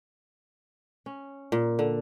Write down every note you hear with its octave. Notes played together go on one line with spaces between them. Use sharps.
C#4
A#2
D3